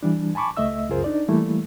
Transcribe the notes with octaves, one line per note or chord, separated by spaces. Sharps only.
E3 G3 D4
G#5 A5 B5 C#6 D6
C#2 A3 D#5 E5 E6
C#2 F#2 F4 G#4 A#4 C5
D4 D#4 D5
E3 G3 A3 A#3 E4